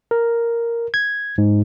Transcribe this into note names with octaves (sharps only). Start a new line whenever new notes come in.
A#4
G#6
G#2